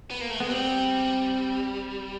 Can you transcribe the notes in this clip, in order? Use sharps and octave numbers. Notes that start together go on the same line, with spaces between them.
B3
A#3
A3
G#3 B3
G3 C4